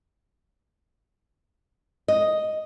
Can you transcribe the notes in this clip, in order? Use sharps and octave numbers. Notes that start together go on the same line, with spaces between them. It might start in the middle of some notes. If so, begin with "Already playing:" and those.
D#5